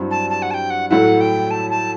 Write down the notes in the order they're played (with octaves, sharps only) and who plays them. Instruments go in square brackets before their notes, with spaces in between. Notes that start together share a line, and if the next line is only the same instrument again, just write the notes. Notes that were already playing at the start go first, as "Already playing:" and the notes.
Already playing: [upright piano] G2 F#3 C4 E4
[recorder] A5
A5
F#5
A5
G5
F#5
[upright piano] A2 F#3 A3 E4 [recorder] F#5
[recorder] G5
A5
A5